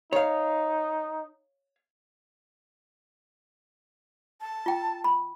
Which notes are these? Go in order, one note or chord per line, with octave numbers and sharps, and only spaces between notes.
D#4 C#5 F5
A5
F4 G5
B5